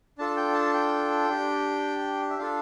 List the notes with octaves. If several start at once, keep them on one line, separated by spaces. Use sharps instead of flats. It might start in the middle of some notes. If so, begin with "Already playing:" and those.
D4 F4 A4 A5
G5
A5
G5
D4 G4
E5
D4 F4 A4 F5